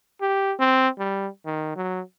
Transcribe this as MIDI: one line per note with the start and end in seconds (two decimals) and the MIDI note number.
0.21 0.53 67
0.59 0.89 60
0.99 1.28 55
1.45 1.72 51
1.76 2.01 54